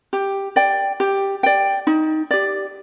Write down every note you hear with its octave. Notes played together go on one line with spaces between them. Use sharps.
G4
D5 G5
G4
D5 G5
D#4
G4 D5